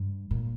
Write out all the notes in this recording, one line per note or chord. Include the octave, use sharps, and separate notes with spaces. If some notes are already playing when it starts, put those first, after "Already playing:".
Already playing: G2
A#2